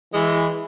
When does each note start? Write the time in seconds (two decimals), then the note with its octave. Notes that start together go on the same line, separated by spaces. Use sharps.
0.12 E3 G#3